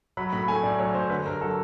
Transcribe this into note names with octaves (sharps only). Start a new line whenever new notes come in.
F#3 B5
A2 B5
A3 G#5
A2 D5
F#3 C#5
A2 C5
D3 B4
G2 A#4
F#3 A4